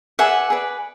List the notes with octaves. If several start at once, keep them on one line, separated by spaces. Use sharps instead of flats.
G#4 B4 D5 E5 F#5
G#4 B4 D5